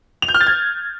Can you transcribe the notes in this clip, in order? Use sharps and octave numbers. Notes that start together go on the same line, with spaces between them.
F7
G6
F6
A6
G#6